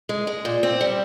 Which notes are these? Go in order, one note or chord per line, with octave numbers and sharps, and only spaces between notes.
G#3
G#3
A#2
C4
G3